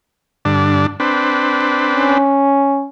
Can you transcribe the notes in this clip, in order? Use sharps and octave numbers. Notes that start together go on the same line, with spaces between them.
G2 D3 D4
C4 D4 B4
C#4